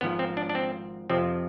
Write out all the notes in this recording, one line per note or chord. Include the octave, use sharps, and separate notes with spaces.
G#1 G#2 F3 B3
C4
D4
D4
C4
F2 C3 F3 C4